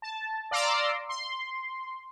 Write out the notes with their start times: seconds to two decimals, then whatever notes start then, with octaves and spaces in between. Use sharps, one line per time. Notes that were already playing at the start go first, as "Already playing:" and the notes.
0.02 A5
0.51 D5 F5 A#5 C6 D6 E6
1.09 C6